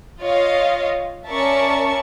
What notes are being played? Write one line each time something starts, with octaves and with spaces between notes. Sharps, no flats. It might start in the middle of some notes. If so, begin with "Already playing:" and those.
F4 C#5 D#5 F5
C#4 A#4 D5 E5 A5 C#6